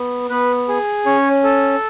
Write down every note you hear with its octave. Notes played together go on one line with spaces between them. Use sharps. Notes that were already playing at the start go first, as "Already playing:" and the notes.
Already playing: B3
B3 B4
G#4
C#4 C#5
A4